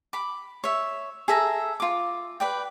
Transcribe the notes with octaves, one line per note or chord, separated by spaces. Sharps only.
B5 D6
C#5 E5
G#4 A4 E5 A#5
F4 D6
B4 D5 G5